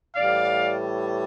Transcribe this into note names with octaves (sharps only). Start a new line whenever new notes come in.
A2 E3 G3 D5 F5